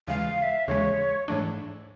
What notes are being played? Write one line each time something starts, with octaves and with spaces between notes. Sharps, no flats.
D#2 C#3 E3 G#3 F5
F5
E5
D#2 C#3 E3 G#3 C#5
G#2 E3 A3 D4